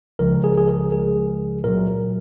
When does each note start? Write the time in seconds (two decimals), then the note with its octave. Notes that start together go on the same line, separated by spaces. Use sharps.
0.19 C#2 C#3 F3 G#3 A#4
0.44 G#4
0.57 G#4
0.68 A#4
0.92 C#2 C#3 F3 G#3 G#4
1.64 A#2 F#3 A#4